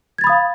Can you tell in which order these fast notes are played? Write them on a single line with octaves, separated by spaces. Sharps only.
G#6 A6 B5 D#6 F5